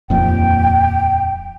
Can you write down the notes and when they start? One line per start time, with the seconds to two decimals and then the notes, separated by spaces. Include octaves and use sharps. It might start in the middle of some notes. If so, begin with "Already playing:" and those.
0.10 D#1 F2 A#2 G5